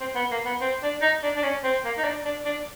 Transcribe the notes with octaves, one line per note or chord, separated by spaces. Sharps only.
C4
B3
A#3
B3
C4
D4
D#4
D4
D4
C#4
C4
A#3
D#4
D4
D4
D4